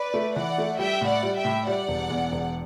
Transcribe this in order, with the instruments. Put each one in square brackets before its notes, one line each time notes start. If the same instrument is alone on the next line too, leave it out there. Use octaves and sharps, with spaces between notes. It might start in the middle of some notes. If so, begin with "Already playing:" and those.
Already playing: [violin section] B4 D5
[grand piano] A3
[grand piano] E3 [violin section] D5 F#5
[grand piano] A3
[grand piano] G3 [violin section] E5 G5
[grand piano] A2
[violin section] D5 F#5
[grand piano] G3
[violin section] E5 G5
[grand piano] A2
[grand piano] G3 [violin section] D5 F#5
[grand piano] E1
E2
E1